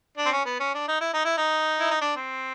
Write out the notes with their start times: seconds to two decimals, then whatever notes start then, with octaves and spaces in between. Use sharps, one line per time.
0.17 D4
0.26 C4
0.32 C#4
0.45 B3
0.60 C#4
0.75 D4
0.88 D#4
1.01 E4
1.13 D#4
1.25 E4
1.37 D#4
1.80 E4
1.91 D#4
2.01 D4
2.16 C4